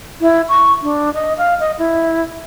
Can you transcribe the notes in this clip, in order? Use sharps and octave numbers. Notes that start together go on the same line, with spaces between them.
E4
C#6
D4
D#5
F5
D#5
E4